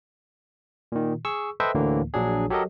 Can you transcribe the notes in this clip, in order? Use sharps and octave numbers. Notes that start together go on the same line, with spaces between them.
A#2 D#3
G#4 C#6 E6
A4 B4 C5 D#5 E5 G5
D2 A2 D3 E3 A#3
A#1 F#3 D4 G#4
F#3 G4 A4 A#4 D#5